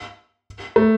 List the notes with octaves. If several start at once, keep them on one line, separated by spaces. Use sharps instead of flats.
A3